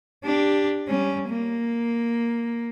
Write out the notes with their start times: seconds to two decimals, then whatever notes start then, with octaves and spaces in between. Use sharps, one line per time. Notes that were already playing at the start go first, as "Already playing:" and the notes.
0.24 D4 G4
0.88 G3 C#4
1.29 A#3